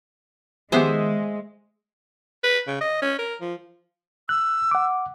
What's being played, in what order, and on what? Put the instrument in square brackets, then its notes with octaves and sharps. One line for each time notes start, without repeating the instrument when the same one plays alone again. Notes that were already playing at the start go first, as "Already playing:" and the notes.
[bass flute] D#3 [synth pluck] F3 B3 G4 [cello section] G#3 [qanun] G#4 C5 E5
[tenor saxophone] B4
C#3
D#5
C#4
A#4
F3
[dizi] E6 [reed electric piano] F#6
[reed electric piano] F#5 D6